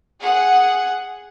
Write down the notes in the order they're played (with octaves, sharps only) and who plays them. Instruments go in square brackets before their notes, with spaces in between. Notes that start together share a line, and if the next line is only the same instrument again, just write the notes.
[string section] G#4 F#5